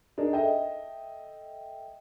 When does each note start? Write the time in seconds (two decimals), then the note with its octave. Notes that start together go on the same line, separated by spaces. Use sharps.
0.18 D4 D#4 G#4 A#4
0.33 A4 D#5 E5 G5